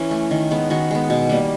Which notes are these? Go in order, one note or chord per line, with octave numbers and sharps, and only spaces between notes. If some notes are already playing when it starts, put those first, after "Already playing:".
Already playing: E3 C#4
A3
D#3
G#3 B3
D#3 F#4
G#3 B3
B2
G3 A#3